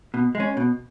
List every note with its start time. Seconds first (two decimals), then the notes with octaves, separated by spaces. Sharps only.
0.14 B2
0.35 G#3
0.40 C#4
0.57 B2